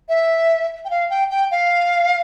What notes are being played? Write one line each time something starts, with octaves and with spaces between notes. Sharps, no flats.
E5
G5
F5
G5
G5
F5